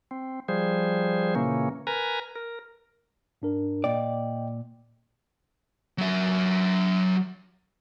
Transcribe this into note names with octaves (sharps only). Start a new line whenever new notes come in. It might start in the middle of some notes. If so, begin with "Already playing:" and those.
C4
F3 G3 G#4 C5
A#2 C#3 E3 A#3 C#4
A#4 B4 G#5 A#5
A#4
G#2 D4 A#4
A#2 D5 D#5 G5
F#3 E5